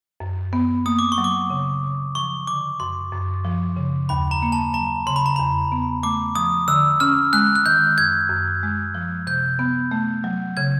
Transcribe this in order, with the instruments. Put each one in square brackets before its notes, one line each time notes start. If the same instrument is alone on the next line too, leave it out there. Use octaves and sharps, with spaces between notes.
[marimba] F#2
B3
[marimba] A#3 [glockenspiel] D#6
[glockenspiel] D6
C#6
[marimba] F#3
[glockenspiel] D6
[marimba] C#3
C#3
[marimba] F3 [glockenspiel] C#6
[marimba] D3 [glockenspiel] D6
[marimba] F#2 [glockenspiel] C6
[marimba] F#2
F3
C#3
[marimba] D#2 [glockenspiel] B5
[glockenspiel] A#5
[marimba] A#3
[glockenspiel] A5
[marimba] F#3 [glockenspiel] A#5
[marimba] C#3 [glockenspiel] C6
[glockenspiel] B5
A#5
[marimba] E2 [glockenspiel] B5
[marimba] B3
[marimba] A3 [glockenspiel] D6
[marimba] F3 [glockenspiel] D#6
[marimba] D3 [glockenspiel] E6
[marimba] C#4 [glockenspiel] F6
[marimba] G#3 [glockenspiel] F#6
[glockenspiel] F#6
[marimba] D#3 [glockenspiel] G6
[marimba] F#2 [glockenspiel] G#6
[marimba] F#2
G#3
F3
[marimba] C3 [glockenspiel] G6
[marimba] B3
A3
F#3
[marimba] C#3 [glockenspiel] G#6